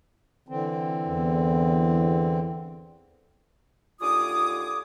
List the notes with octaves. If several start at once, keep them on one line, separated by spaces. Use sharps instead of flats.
D3 E3 C4
E2
D#2 D3 F4 G#5 D6 D#6